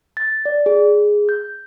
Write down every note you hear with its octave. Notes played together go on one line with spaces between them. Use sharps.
A6
D5
G#4
G6